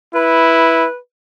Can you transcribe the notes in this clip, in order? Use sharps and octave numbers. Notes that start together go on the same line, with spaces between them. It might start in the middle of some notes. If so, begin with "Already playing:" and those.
E4 B4